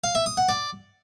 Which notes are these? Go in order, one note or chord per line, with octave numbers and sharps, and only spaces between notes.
F5
E5
D#6
F#5
D5